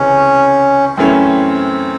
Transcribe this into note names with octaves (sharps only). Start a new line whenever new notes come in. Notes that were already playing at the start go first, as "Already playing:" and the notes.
Already playing: C#2 C3 E3 G#3 C#4
F#2 E3 A3 C4 C#4 E4